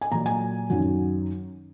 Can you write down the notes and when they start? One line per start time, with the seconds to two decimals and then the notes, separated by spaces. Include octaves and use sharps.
0.01 G#5
0.12 A#2 F#3 A#5
0.26 G#5
0.70 F#2 D#3 F#3